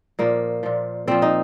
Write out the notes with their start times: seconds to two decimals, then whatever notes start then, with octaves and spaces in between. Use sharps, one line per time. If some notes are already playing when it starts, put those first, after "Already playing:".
0.19 A#2 F3 A#3
0.63 A#2 F3
1.07 A#2 F3 C4
1.22 D#4